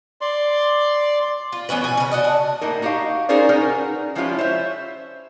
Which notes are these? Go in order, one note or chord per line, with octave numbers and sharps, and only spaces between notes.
D5 C6
F4
E3 B3 C#4 B4
B2 G#5
C#3 C#5
F#4 D5 D#5
D4
A2 A#3 D#4 A#4
D#4 F#4 G4 D#5 F5
C#4 D#4 G#4 A#4 C5 D5
C#4 D#4 F#4 G#4 A#4 B4
F3 G#3 C#4 E4 F4 G4
C5 C#5 E5